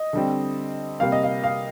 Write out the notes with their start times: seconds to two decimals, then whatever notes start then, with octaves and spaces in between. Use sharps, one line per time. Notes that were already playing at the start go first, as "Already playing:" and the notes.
Already playing: D#5
0.13 D3 G3 C4
1.00 C3 G3 A#3 F5
1.12 D#5
1.23 F5
1.44 F5